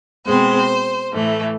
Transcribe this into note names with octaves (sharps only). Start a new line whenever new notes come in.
B2 G#3 C4 C5
A2 E3 A3